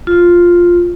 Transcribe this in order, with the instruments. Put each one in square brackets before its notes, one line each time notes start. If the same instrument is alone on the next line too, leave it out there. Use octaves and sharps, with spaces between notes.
[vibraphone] F4